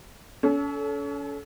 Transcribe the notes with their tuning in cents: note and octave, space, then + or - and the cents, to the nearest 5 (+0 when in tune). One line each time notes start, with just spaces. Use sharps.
C#4 +35 A4 -15